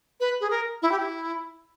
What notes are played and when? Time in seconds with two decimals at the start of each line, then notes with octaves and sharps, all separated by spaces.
0.20 B4
0.41 G#4
0.51 A#4
0.82 E4
0.92 G4
1.00 E4